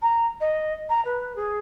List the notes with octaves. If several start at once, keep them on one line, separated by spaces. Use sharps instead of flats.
A#5
D#5
A#5
B4
G#4